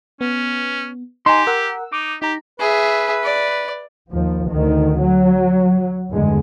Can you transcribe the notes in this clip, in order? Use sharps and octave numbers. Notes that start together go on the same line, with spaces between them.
B3 C#4
D#4 G4 G#5 A#5 C6
A#4 F#5 E6
D#4 D6
D#4 G4 A#5
G#4 B4 E5
D5
D#2 F3
D2 D#3
F#3
E2 G2 D3 G#3